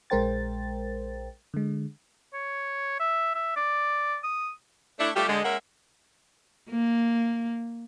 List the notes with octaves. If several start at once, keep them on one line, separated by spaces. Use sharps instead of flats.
A#1 G#3 A#4 C5 G5 A6
D3 G#3
C#5
E5
E5
D5
D#6
A3 D4 E4
G3 A3 F4 G4
D3 G#3
G#3 A#3 C#4 A#4 E5 F#5
A#3